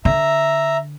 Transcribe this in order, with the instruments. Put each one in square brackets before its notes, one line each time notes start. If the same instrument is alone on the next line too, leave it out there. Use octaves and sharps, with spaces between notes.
[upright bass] D3 [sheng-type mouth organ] E5 A#5